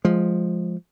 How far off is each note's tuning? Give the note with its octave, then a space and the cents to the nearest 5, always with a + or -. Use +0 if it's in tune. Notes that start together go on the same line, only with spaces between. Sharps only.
F3 +0 G#3 +0